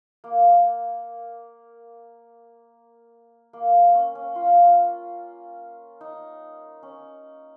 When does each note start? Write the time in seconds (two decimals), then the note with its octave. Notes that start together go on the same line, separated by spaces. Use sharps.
0.24 A#3
3.53 A#3
3.95 C#4
4.15 C#4
4.35 F4
6.01 D#4
6.83 C#4